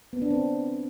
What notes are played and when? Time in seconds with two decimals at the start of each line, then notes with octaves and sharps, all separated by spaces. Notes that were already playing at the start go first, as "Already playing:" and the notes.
0.13 B3
0.22 D4
0.31 C4